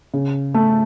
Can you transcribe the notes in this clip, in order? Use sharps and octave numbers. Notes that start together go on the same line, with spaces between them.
C#3
A3